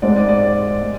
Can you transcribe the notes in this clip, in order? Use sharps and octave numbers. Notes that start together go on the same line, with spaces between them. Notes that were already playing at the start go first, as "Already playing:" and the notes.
G#2 G#3 C4 D5
D5
D5
G#3